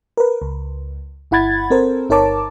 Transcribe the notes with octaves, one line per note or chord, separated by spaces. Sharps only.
A#4 B4
C#2
G1 E4 F#5 B5 G#6 A6
C4 A4 A#4 C5
G1 D#4 A#4 C#5 A5 D6